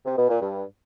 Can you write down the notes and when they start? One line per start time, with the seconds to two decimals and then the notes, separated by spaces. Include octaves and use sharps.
0.06 C3
0.17 B2
0.29 A#2
0.41 G2